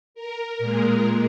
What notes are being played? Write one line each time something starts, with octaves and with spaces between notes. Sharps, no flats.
A#4
A#2 G#3